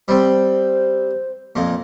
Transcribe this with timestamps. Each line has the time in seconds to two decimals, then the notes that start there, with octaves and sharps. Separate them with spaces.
0.08 G3 C4 C5
1.56 F2 A#2